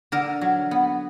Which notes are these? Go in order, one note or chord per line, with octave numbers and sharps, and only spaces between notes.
D3 A#4
F#3
B3